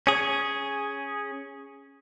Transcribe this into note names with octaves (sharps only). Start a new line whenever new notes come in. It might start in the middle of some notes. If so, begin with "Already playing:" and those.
C#4 G#4